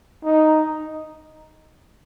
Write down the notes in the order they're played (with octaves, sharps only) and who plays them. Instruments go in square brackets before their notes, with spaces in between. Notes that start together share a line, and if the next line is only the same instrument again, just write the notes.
[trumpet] D#4